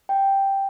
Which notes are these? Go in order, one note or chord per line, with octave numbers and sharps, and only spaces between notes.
G5